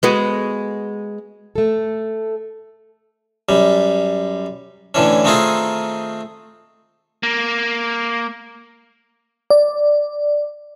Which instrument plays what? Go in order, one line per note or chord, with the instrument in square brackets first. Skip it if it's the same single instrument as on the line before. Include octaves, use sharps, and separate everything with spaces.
[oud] G#3 B3 F#4
[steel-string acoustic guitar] A3 A4
[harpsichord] F#2 G3
A2 D3 E3 C#4
D#3 A3 C4 D#4 F4 G#4
[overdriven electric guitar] A#3
[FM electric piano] D5